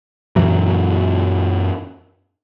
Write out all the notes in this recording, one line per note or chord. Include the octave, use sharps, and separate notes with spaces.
F#2 A#2 E3 F#3